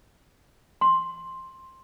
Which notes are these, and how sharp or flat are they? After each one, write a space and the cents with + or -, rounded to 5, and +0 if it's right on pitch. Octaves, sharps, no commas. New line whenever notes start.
C6 +10